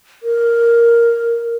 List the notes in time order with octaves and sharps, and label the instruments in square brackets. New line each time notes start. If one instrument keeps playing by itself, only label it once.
[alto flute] A#4